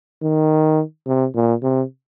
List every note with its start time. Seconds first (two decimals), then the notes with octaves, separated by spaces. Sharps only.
0.22 D#3
1.06 C3
1.35 A#2
1.62 C3